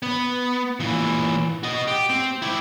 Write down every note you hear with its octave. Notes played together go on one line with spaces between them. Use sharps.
B3
A#2 E3
F#4 D#5
G4
C4
E4 G4